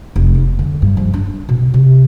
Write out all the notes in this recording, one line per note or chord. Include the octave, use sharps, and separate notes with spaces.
F1
B3
D3
G2
F3
D4
B2
C3